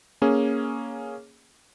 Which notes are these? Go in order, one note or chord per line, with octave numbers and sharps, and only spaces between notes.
A#3 C#4 G#4